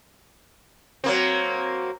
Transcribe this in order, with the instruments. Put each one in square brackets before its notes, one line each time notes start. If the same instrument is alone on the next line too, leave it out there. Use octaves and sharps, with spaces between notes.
[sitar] F#3 A#3 C4